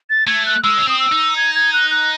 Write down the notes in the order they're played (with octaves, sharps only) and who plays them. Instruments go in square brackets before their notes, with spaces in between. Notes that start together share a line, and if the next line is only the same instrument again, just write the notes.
[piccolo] A6
[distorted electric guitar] A3 [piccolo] G#6
[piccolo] F#6
[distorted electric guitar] G#3 [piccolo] E6
[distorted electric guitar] C#4
[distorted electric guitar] C4 [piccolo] D#6
[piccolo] E6
[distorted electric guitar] D#4
[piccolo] G#6
G#6
F#6
F#6